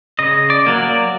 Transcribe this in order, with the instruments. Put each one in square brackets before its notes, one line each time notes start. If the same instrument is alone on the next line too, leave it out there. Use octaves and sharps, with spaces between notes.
[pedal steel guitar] C#3 D#5
D5
F#3 A#3
D5